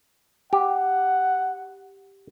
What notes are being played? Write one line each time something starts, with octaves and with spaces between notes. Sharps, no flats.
G4 F#5